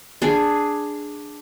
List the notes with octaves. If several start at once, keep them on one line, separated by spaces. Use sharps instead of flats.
D4 G#4